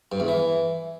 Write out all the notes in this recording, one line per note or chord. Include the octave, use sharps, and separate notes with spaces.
G2
E2
E3